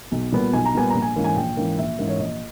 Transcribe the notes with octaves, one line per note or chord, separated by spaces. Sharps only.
B1
A#2 G3 B3
B1 G#5
A#5
A#2 G3 B3 G#5
A#1 A#5
G#5
G#2 E3 A#3 C#4
G#5
A#1 G5
G#2 E3 A#3 C#4
A#1 E5
G#2 E3 A#3 C#4
C#5
A#1 D#5